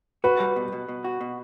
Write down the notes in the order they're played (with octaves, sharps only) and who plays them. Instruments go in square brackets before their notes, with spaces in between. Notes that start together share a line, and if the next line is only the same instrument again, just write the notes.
[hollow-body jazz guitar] F#4 [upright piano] B4
[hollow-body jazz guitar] G3
B2
B2
B2
F#4
B2